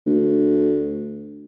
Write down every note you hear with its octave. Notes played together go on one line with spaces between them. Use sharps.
D2